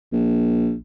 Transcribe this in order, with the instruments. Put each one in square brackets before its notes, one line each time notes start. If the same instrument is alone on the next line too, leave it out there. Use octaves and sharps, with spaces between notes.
[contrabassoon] A#1